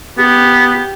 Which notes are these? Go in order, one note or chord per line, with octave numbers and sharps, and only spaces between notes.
B3 G4